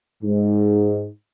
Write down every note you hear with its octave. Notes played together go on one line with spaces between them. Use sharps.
G#2